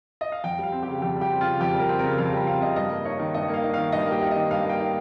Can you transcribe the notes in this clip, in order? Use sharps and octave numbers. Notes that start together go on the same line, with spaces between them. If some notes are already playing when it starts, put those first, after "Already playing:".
D#5
F5
F2 G5
G3 F5
C4
G4
C#3
F2 G4
G3
G4
C4
C#3 F4
F2 G4
G3
A#4
C4
C#3 A#4
F2 F5
G3 G5
C4 F5
C#3 D#5
G2 D#5
A#3
D#4 C#5
D#3
G2 D#5
A#3 F5
D#4
D#3 F5
G2 D#5
A#3
G4
D#4
D#3 D#5
G2 F5
A#3 G5
D#4